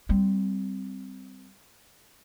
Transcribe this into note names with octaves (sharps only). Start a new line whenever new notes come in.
G3 C4